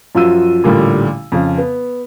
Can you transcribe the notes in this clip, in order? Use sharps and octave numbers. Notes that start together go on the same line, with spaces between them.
F#2 F3 F4 F#4 E6 D#7
A1 A#2 D3 G3
F2 C#3
B3